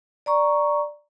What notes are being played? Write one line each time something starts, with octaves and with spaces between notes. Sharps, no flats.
D5 A#5 C#6